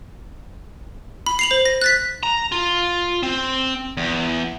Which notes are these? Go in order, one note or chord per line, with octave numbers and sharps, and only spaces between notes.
B5
C7 F7 F#7
C5
A#6
F#6 A6 B6
A#5
F4
C4
E2